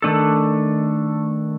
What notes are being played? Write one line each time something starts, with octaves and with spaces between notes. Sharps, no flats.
D#3 A3 D4 A4